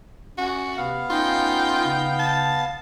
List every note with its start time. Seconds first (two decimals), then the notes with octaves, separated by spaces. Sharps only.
0.38 C#4 F#4
0.77 C3 B3 F5
1.10 C#4 D#4 F4 G5
1.85 C#3
2.19 A5